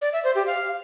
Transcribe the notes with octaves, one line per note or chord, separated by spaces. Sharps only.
D5
E5
C5
G4
F5